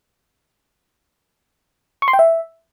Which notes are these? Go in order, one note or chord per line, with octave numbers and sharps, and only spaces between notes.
C#6
C6
G5
E5